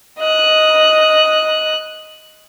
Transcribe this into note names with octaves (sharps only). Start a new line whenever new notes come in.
D#5 F#6